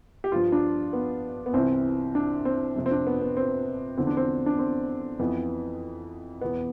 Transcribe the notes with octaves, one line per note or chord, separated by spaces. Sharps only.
G4
G2 F3 F4
D4
B3
B3
C2 C3 E3 C4
D4
C4
F2 C3 F3
C4
D4
B3
B3
C4
E2 D3 F3 C4
D4
C4
D4
C4
F2 E3 B3
E2 B2 B3